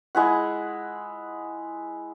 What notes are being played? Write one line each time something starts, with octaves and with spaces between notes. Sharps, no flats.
G#3 E4 F#5